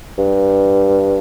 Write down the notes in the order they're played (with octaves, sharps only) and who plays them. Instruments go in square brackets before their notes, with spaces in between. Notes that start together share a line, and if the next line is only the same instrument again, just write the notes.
[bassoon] G2